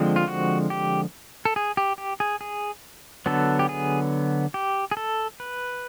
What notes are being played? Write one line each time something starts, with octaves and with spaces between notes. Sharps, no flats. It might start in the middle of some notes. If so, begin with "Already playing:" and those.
Already playing: D3 F3 G#3 C4
F4
F#4
G4
A4
G#4
G4
G4
G#4
G#4
D3 F#3 B3 A4
G4
G#4
G4
G#4
A4
B4